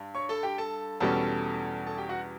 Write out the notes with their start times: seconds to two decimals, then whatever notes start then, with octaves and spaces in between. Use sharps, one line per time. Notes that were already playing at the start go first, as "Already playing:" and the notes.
Already playing: G2
0.15 C#5 C#6
0.29 A4 A5
0.43 G4 G5
0.58 A4 A5
1.00 E2 B2 G3 C#4 A4 A5
1.87 A4 A5
1.98 G4 G5
2.09 F#4 F#5